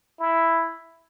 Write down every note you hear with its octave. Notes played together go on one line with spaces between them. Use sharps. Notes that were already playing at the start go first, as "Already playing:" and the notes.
E4